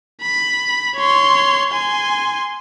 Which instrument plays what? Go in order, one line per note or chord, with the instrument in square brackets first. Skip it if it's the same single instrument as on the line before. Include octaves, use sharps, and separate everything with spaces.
[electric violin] B5
C#5 C6
G#5 C6